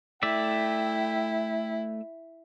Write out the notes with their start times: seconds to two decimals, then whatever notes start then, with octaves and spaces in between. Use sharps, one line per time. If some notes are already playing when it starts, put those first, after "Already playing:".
0.23 A3 E4 D5 E5 G5